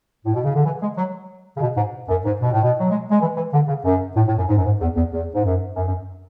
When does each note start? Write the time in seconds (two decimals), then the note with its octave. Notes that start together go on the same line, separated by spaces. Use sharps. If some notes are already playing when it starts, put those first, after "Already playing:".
0.25 A2
0.34 B2
0.44 C#3
0.54 D3
0.65 E3
0.81 G#3
0.96 F#3
1.57 C#3
1.61 B2
1.76 G#2
2.09 F#2
2.25 G#2
2.41 B2
2.51 A2
2.62 B2
2.79 F#3
2.89 G#3
3.10 G#3
3.20 E3
3.36 E3
3.53 D3
3.68 C#3
3.84 F#2
4.15 A2
4.27 A2
4.37 F#2
4.48 G#2
4.56 F#2
4.64 G#2
4.80 E2
4.95 E2
5.12 E2
5.34 G#2
5.43 F#2
5.76 F#2
5.86 F#2